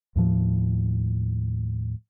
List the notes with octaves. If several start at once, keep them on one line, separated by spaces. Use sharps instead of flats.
D#2 A2 F3